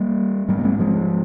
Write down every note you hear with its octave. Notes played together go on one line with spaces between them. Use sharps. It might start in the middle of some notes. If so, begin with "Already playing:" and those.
Already playing: G3 A#3
G#2 G3 A#3
A#3
G#3 C4
F3 G#3